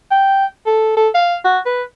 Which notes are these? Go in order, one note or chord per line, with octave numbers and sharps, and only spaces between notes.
G5
A4
A4
F5
F#4
B4